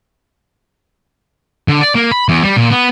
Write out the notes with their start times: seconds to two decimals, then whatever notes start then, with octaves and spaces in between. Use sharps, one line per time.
1.68 D3
1.81 D5
1.95 A#3
2.12 B5
2.29 E2
2.43 G3
2.57 A#2
2.71 B3